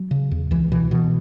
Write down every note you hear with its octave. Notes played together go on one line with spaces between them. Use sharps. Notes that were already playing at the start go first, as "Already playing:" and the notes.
Already playing: F#3
C#3
E2
C#2 E3
B2 E3
B2 E3